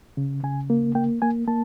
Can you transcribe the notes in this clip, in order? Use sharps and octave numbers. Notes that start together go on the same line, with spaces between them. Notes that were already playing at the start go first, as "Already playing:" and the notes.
C#3
C#3 G#5
A#3
A#3 G5
A#3 G#5
A#3 A5